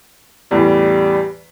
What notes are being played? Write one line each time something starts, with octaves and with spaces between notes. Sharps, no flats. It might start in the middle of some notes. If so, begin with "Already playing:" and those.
E2 A2 G3